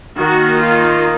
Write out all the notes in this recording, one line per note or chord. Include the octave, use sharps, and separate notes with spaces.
D#3 A#3 D#4 F#4
F4